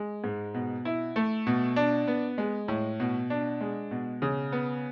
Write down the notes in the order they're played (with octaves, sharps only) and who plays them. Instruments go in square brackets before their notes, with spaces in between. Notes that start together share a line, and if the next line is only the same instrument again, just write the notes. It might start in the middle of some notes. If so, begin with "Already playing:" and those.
Already playing: [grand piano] G#3
G#2
B2
E4
A3
B2
D4
B3
G#3
A2
B2
D4
G#3
B2
C#3
B3